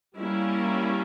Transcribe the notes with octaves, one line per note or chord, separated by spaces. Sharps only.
G3 A#3 C#4 E4